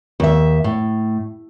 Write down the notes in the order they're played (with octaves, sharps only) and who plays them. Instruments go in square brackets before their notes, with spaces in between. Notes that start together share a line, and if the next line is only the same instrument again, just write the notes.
[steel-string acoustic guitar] D#2 E5
A2